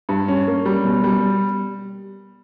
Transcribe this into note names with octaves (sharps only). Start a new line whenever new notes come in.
G2
C#4
A#3
G3
B2
G3